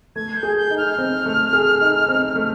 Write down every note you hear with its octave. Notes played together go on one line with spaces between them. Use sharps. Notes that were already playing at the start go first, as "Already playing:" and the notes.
A3 G#6
G6
G#4
G6
D#4
F6
C4
A3
G#4
D#4
C4
A3